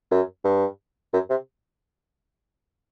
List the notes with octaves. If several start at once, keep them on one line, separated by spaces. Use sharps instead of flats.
F#2
G2
F#2
C3